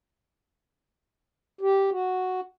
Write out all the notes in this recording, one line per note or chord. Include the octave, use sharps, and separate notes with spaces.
G4
F#4